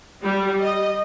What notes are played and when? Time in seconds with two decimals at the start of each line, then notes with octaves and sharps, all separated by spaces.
0.23 G3
0.61 D#5